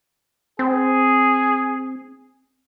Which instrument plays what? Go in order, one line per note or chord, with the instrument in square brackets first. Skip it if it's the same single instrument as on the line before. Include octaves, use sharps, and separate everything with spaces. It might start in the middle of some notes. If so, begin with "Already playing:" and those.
[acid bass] C4 [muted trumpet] G#4